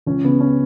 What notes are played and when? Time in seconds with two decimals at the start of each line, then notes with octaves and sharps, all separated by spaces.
0.06 C#2 C#4
0.24 C#3 B3
0.40 C#4